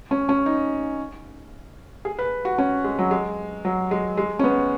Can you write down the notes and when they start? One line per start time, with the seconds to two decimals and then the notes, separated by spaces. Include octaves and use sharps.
0.11 C#4
0.29 C#4
0.46 D#4
2.05 G#4
2.19 B4
2.45 F#4
2.58 C#4
2.84 G#3
2.99 F#3
3.11 G#3
3.65 F#3
3.91 G#3
4.17 G#3
4.39 C#4
4.44 B3